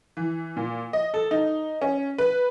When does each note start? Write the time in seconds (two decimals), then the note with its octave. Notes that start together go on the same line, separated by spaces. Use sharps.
0.17 E3
0.57 A#2
0.93 D#5
1.14 A4
1.31 D#4
1.82 C#4
2.18 B4